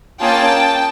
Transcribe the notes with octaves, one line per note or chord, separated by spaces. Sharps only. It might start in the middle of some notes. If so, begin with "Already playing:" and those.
A#3 C#4 F4 G#4 G5 A5